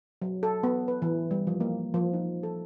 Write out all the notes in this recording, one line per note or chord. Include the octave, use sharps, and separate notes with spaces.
F#3
A4
B3
B4
E3
G3
F3
A#3
F3
D#4
A4